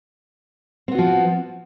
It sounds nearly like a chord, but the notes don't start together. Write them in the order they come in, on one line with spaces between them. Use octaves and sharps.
C4 B3 F#4 F3